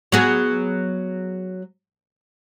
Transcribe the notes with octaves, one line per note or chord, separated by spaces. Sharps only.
F#3 B3 G#4